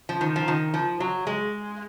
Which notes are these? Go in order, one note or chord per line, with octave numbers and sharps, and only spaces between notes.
F3
D#3
F3
D#3
F3
F#3
G#3